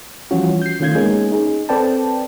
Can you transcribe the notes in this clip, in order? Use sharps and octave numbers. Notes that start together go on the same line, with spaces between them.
E3 F3 G3 C#4 F4 F#4
G6 C7
D#3 A3 C#4 F4 G6 G#6
G#3 A#3 B3 C#4 D#4 G#4
D#4 G#4
C4 A4 B4 D5 G5 A5